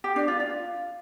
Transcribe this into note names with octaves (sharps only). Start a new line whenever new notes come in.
G4
D4
F4
F4